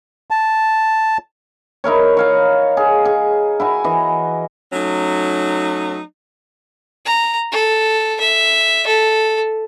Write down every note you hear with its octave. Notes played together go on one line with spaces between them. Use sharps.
A5
D#4 E4 A#4 C#5
C#5 F5 A#5
G#4
G#4
E4 F#4 G#5
E3 D#5
F#3 A3 C#4 D#4
A#5
A4
E5
A4